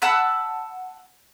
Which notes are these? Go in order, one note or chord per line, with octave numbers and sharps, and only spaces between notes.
F#5 A5 B5 E6